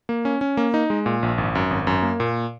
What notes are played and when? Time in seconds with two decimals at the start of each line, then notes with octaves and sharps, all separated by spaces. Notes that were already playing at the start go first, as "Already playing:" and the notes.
0.09 A#3
0.25 C#4
0.41 C#4
0.57 A#3
0.74 D#4
0.90 G#3
1.06 A#2
1.23 A#1
1.38 G#1
1.55 F#2
1.71 G#1
1.87 F#2
2.03 A#3
2.20 A#2